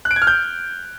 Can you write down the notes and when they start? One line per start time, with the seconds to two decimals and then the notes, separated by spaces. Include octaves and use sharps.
0.05 F#6
0.11 D7
0.16 G#6
0.22 F6
0.27 G6